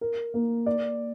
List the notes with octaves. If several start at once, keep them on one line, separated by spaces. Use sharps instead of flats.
A#4
A#3
D5